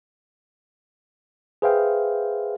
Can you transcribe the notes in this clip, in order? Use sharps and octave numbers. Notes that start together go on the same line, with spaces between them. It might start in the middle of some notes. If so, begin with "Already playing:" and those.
G#4 B4 C5 E5 F5 G5